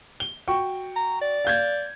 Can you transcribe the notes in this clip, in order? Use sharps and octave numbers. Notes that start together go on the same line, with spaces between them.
G7
F#4 G5 C#6
A#5
D5
F5 G6 G#6